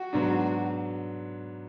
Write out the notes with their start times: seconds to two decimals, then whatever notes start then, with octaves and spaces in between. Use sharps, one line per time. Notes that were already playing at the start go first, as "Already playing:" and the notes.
Already playing: F#4
0.13 G#2 F#3 B3 D4